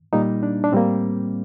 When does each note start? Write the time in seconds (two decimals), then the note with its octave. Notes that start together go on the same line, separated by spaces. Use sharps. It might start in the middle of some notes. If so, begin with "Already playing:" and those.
0.13 A#2 G3 A#3 D#4
0.43 D4
0.64 D4
0.72 A2 G3 A#3 C4